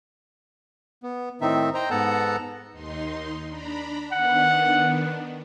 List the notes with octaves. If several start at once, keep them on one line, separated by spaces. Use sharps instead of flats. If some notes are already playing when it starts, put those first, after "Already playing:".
B3
A2 D#3 C4 D#4 E5
C5 D#5 G5 A#5
G#2 B3 A4 F#5 A5 A#5
D#2 D#4 C6
D4 A#5 B5
D#3 B3 D4 F#5